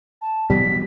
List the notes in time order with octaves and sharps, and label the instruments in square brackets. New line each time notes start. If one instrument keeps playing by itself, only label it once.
[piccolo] A5
[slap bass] B2 E3 F#3 [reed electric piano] G3 [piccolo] B6